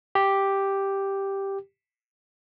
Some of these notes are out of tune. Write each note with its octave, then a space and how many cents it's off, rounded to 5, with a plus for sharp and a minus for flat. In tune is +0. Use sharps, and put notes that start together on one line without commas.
G4 +0